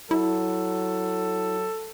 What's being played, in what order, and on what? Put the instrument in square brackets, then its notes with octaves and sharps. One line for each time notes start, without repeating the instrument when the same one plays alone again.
[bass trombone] F#3 [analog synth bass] E4 [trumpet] A4